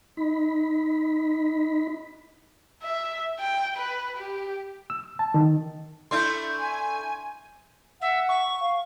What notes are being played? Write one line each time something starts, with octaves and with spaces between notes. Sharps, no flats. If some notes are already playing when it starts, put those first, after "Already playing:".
D#4 B5
E5
G5
B4
G4
E6
A5
D#3
A3 D4 E4 C6 G6
G#5
E5 F#5
C#6
F5